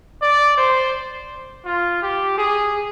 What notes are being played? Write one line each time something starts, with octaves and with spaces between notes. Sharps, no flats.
D5
C5
F4
G4
G#4